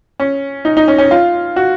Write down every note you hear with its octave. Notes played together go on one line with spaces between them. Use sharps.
C#4
D#4
D#4
C#4
C#4
F4
F#4